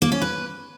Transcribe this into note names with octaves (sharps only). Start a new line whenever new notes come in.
A#3
C#4
B4